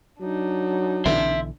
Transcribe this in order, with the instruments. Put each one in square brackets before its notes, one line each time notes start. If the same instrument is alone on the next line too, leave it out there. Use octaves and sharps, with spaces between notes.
[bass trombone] F#3 [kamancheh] D4 D#4
[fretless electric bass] B1 D3 E3 [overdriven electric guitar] E5 C6